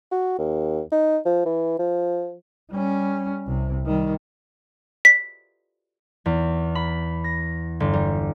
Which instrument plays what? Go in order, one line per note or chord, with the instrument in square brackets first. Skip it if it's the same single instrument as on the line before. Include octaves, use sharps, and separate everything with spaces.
[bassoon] F#4
D#2
D#4
F3
E3
F3
[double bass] G3 C#4
C2 C3
D#3 G3
[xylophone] B6
[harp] E2
B5
A#6
G1
G3